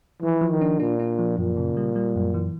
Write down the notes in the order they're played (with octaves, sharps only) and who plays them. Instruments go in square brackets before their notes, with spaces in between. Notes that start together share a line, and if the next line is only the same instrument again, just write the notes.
[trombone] E3 [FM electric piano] F3
[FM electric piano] F3
[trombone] D#3
[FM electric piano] D4
[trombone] A#2 [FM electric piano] D4
[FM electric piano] D4
F3
[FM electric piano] F#2 [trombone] A#2
[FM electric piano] C#3
G3
G3
F#2
E3